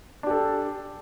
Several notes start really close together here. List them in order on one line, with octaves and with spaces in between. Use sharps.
D4 G4 A4